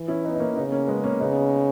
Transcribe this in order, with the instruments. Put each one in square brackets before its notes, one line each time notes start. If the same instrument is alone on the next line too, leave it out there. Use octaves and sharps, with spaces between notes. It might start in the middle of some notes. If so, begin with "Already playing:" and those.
Already playing: [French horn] E3
[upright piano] C#4 E4
B3 D#4
D#4
A#3 C#4
[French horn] C#3 [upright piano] B3 D#4
[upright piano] A#3 C#4
G#3 B3
A#3 C#4
[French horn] C#3 [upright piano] B3 D#4